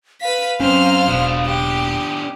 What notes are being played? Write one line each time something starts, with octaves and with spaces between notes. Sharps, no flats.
B4 F5 B6
F#2 C4 C#4 C5 F6
E1 B2 B3 D4
G4